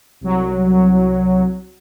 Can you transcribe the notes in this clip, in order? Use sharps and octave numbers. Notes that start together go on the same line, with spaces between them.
C2 F#3